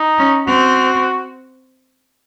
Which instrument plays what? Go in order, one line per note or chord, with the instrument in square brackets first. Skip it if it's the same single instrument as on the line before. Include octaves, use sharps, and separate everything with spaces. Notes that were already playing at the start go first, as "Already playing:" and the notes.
Already playing: [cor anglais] D#4
[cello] C#4
[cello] C4 [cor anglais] F#4